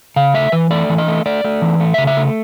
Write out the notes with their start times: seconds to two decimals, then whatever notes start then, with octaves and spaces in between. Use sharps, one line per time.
0.16 C#3 F5
0.34 A3 E5
0.52 E3 B4
0.71 A3 D5
0.90 E3
0.98 D#5
1.08 A3
1.26 A3 D5
1.44 A3
1.62 E3
1.80 A3
1.94 C#3 E5
2.07 E5
2.17 A3